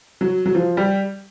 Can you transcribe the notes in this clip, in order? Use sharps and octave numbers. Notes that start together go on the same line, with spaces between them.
F#3
F#3
F3
G3